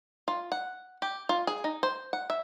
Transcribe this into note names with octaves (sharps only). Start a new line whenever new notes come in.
F4
F#5
G4
F4
G#4
D#4
C5
F#5
E5